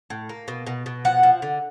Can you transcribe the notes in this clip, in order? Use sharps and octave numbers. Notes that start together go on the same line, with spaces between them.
A2
A#3
B2
B2
B2
F3 F#5
F3
D3